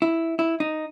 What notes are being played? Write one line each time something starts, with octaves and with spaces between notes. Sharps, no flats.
E4
E4
D#4